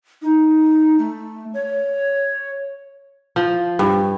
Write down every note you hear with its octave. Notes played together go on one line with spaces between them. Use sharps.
D#4
A3
C#5
F3
G2